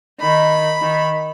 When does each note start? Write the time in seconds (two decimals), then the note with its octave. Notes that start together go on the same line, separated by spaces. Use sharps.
0.21 D#3 B5
0.82 D#3